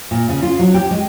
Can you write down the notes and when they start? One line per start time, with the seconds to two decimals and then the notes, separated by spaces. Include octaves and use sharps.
0.11 A#2
0.29 C#3
0.42 F4
0.59 F#3
0.74 G4
0.91 G#3